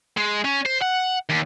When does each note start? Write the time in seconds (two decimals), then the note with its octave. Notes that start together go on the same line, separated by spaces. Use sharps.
0.17 G#3
0.45 C#4
0.66 C5
0.82 F#5
1.30 D#2